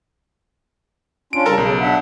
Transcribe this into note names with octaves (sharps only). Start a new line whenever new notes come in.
C#4 D4 F4 D7
C#3 G3 A4 A#4 A5
B1 C#3
D4 E5 F#5